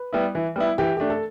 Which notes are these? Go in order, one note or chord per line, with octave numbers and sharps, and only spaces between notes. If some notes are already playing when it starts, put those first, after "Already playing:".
Already playing: B4
G3 B3 E4
E3
G3 B3 E4
E3 G4
A3 D4 G4
A4